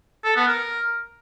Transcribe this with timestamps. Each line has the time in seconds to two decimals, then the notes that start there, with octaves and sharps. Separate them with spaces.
0.24 A4
0.36 B3
0.48 A#4